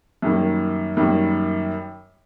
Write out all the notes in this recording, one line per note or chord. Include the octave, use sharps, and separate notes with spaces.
F#2 D#3 G3 A#3
F#2 D#3 G3 A#3